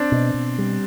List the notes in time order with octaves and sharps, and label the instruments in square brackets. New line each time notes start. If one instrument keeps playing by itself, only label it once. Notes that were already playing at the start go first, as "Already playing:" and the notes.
Already playing: [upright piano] C4 D4
[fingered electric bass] B2
B2
G3